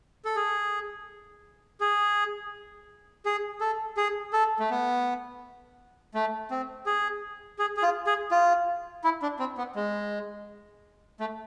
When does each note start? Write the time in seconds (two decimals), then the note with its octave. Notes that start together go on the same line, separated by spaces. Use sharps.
0.25 A4
0.36 G#4
1.80 G#4
3.26 G#4
3.61 A4
3.97 G#4
4.33 A4
4.59 A3
4.70 B3
6.14 A3
6.51 C4
6.86 G#4
7.59 G#4
7.77 G#4
7.82 F4
8.06 G#4
8.31 F4
9.04 E4
9.22 D4
9.39 C4
9.58 B3
9.75 G#3
11.20 A3